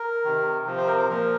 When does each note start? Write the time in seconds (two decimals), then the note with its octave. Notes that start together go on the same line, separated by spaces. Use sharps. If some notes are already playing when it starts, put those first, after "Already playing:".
Already playing: A#4
0.24 C3 D#3
0.67 C3 F3
0.77 C5
0.87 A#4
0.98 C5
1.09 A#2 F3 A#4